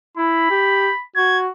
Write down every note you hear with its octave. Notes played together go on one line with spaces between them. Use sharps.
E4 B5
G4
F#4 G#6